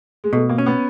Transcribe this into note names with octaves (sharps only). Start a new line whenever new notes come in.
G#3
B2 A3
A#3
C#4
B3